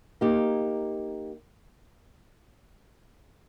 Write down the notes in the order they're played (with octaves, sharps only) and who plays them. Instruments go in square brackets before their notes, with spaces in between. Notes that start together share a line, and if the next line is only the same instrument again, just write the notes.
[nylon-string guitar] A#3 D#4 G4